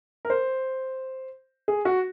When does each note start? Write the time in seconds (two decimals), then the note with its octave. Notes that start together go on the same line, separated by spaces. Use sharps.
0.25 A#4
0.30 C5
1.68 G#4
1.85 F#4